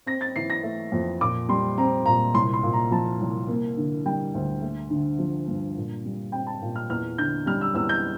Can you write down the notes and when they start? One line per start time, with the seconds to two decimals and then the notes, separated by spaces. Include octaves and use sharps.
0.06 C4 A#6
0.21 A6
0.36 E3 C7
0.50 A#6
0.63 A3
0.92 F2
1.21 A#2 D6
1.49 G3 C6
1.78 C4 A#5
2.06 A#2 A#5
2.34 C2 C6
2.54 C6
2.63 A#2
2.73 A#5
2.91 F3 A5
3.21 C2
3.48 A#3
3.77 D3
4.05 G3 G5
4.34 D2
4.62 A3
4.90 D3
5.19 F3
5.48 G2
5.77 A#2
6.05 G3
6.32 C4 G5
6.47 A5
6.62 A#2
6.76 F6
6.90 E2 F6
7.18 D3 G6
7.46 G3 F6
7.61 E6
7.75 E2 E6
7.89 G6